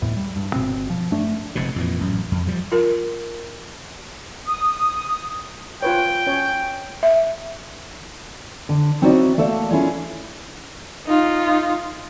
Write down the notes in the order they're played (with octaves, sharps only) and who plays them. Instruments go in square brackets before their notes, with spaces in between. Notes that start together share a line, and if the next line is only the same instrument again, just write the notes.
[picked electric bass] D1 E2 A2
G3
G2
G1 B2 C4
F3
G2 A3 D4
[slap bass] F1 F2 G#2 B2
F2 A#2 E3
A1 F#2
F2
F3 G3
[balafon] F4 A#4
[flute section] D#6
[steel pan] F4 B4 C#5 [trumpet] G5
[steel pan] C#4 C#5
[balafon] E5
[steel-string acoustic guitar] D3
C4 D#4 E4 F#4 C#5 D5
A3 A#3 A4 D5
C#4 E4 F4 G#4 A4 C#5
[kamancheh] D#4 F4